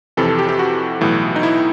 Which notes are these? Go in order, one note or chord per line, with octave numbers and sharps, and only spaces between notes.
F2 C3 E3 A4
A4
G4
G4
F#4
B1 A2 E3
D#4
E4